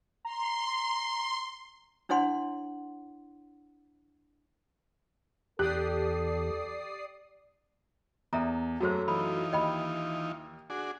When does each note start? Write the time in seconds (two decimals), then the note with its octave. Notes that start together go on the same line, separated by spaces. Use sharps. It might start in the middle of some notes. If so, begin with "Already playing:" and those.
0.25 A#5 C6
2.09 D4 E4 C#5 F#5 C6
5.59 E2 G4 A4 D5 D#6 F#6 C7
8.33 E2 A4 E5 A#5
8.81 F#2 F#3 A3 A#3 F#4 G#4 C5
9.08 E3 D#4 F4 B5
9.53 D#2 D#5 G5 B5
10.70 D4 F#4 G#4